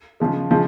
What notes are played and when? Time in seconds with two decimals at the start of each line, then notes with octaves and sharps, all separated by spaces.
0.20 C#3 F3 G#3
0.51 C#3 F3 G#3